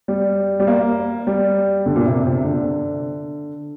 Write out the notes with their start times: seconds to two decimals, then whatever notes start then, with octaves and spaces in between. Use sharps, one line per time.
0.08 G3
0.60 G3
0.67 A#3
1.27 G3
1.86 D3
1.96 A#2
2.06 C3
2.26 C3
2.44 D3